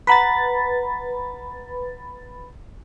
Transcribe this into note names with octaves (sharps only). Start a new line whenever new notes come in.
B4 F#5 A#5 B5 A6 B6